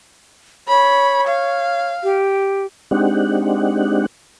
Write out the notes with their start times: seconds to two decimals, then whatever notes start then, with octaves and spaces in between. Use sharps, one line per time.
0.68 C#5 B5
1.27 F5
2.03 G4
2.91 G#3 C4 D4 D#4 G4 F#5